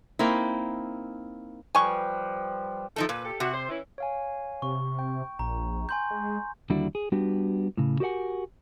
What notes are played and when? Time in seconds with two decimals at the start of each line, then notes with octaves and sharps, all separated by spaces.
0.19 A#3 C4 D#4 E4
1.75 F3 G3 B4 G#5 C#6
2.96 F3 A3 D#4 A4
3.09 A#2 B4
3.24 G4 A4
3.40 C3 F#4
3.53 C5
3.69 E3 C#4 E4
3.98 C#5 F5 G#5
4.62 C3 C#6
4.99 G5
5.39 A#1 A#5
5.89 G#5 C6 G6
6.11 G#3
6.70 D#2 D3 G3 D4 E4 F#4
6.95 G#4
7.12 G3 B3 D4 F#4 G4
7.77 A2 C#3
8.00 F#4 G4 A#4 D5 F#5 G#5